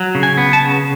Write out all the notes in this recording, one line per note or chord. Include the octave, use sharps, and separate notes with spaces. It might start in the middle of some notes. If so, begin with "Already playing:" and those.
Already playing: F#3
C#3
G#5
B3
A5
C#3